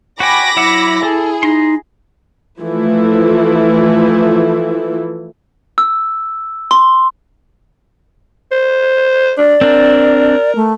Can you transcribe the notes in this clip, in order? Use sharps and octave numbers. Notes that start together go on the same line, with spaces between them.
F#4 G5 G#5 B5 D6 A#6
F#3 E4 E5 F#5
G#4 A4
D#4 A#5 C6
E3 F3 A3 E4
E6
C6
C5
D4 D5
C4 D4 A#4
A3